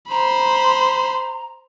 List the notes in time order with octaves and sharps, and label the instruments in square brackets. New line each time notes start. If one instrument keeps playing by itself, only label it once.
[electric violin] C5 B5 [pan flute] A#5